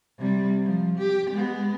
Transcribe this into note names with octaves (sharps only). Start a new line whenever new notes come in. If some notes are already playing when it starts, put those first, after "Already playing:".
C3 G3
F3
G4
G#3 B3